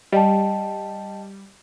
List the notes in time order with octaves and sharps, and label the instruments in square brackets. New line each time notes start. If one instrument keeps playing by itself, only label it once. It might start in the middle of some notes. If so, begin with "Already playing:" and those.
[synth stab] G3 [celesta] D#5 G5 A5